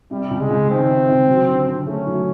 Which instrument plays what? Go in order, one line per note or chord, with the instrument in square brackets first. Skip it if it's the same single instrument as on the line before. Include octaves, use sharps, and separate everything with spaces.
[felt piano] C3 [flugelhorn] G3
[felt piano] C#2
[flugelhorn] G#3
[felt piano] C#2
[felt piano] D#3 [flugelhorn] C4
[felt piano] C3
C#2
F#3
D3
D3
[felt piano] A3 [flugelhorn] C#4
[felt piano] F#3